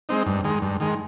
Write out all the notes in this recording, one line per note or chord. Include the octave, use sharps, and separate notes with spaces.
G#3 C4 D#4
G2
D#3 G#3
G2
D#3 G#3